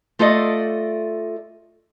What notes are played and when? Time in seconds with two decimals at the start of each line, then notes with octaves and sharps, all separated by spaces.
0.19 A3 F4 A4 D5 D#5